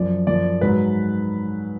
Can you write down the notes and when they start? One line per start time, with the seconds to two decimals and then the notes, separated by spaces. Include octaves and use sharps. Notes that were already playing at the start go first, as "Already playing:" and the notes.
Already playing: F#2 F3 D5
0.27 F#2 F3 D5
0.61 G#2 F#3 B4